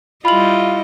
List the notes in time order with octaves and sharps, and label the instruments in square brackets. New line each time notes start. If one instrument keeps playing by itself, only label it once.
[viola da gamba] G3 E4 D#5 [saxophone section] F4 [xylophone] B5 F#7